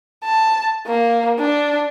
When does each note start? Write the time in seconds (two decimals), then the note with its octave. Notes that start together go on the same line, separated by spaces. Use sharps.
0.24 A5
0.87 A#3
1.38 D4